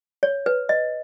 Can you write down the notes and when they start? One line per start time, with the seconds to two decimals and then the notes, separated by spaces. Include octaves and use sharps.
0.23 C#5
0.46 B4
0.69 D#5